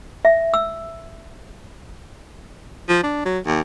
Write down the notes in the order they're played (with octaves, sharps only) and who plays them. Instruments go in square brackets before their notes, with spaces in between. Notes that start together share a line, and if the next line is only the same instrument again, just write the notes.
[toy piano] E5
E6
[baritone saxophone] F3
D4
F#3
D#2